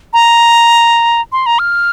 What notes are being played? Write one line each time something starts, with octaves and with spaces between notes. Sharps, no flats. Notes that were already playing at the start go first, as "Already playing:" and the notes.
A#5
C6
A#5
F6